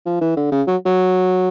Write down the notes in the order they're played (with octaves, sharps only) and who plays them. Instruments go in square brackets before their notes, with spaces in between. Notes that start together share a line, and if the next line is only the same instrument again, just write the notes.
[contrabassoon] F3
E3
D3
C#3
F#3
F#3